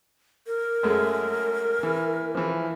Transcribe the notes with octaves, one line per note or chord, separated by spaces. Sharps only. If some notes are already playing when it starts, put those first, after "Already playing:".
A#4
F#2 G#3 A3
E3
E3 F3